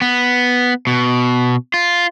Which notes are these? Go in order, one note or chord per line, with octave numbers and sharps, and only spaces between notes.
B3
B2
F4